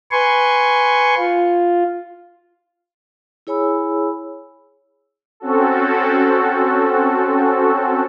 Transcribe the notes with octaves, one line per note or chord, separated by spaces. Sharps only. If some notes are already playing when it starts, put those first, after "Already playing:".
B4 G#5 C6 C#6
F4
E4 G#4 C#5 G#5 B5 E6
C4 C#4 F#4 A4